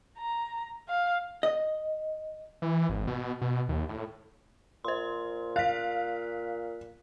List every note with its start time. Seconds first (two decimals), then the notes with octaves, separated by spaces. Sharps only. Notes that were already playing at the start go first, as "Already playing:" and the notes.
0.18 A#5
0.89 F5
1.43 D#5
2.62 E3
2.89 G#1
3.07 B2
3.42 B2
3.69 D#2
3.89 A2
4.84 A#2 C5 C6
5.56 F5 F#6 B6